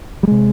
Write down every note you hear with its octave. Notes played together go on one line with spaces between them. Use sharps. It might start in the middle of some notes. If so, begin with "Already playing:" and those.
G3
C3 G#3